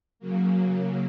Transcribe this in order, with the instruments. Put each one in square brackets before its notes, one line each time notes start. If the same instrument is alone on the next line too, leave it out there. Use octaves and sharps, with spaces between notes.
[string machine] C#3 F#3 A#3